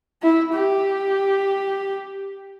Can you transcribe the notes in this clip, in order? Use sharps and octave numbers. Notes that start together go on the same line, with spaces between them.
E4
G4